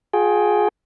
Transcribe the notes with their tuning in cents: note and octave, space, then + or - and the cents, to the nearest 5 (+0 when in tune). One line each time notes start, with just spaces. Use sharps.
F4 +40 G#4 +10 G5 +0